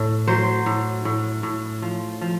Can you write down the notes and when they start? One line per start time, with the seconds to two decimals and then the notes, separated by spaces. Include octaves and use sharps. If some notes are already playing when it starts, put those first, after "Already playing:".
Already playing: A2
0.28 F#3 C5
0.66 A2
1.05 A2
1.43 A2
1.82 F3
2.21 F3